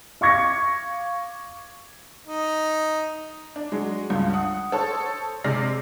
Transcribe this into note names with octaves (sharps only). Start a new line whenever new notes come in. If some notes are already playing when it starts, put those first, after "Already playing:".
F5 C#6 D6 G#6 A#6 C#7
D#4
D4
F#3 G#3
C#2 G2
F#5 D#6
A4 C5 C#5 A5
C3 G#3 D5 F6 A#6 C7